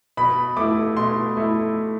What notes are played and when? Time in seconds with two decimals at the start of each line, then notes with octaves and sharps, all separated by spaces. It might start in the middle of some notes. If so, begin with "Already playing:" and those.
0.17 B2 B5
0.57 A3 E4 D6
0.97 B2 C6
1.37 A3 E4